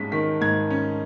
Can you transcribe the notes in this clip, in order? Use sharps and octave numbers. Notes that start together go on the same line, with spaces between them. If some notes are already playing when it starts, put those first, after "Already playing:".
Already playing: G#2 G#3 C#4 B6
D#3 B6
G#2 G#6
C#4